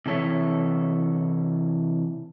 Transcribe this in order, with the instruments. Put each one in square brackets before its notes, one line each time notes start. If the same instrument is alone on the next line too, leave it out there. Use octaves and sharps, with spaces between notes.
[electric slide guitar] C3 E3 A4 C#5 E5